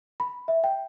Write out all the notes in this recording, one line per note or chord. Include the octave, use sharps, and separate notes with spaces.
B5
E5
G5